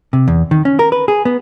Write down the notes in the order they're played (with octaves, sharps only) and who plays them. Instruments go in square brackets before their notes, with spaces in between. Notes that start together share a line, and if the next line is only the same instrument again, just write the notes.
[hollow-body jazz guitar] C3
E2
D#3
C#4
A#4
B4
G#4
B3